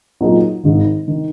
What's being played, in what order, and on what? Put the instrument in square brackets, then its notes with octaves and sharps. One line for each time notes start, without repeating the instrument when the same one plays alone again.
[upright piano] A#2 F#3 A#3 D#4 G#4
G#1 G#2 D#3
D#3